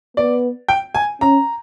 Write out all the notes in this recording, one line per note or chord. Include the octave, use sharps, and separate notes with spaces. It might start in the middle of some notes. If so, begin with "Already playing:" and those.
B3 D5
G5
G#5
C#4 A#5